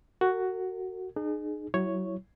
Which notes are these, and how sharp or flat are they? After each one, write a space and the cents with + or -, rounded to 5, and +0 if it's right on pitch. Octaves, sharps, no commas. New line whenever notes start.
F#4 +10 A#4 -45
D#4 -40 G#4 +15
F#3 +25 E4 +10 C#5 +0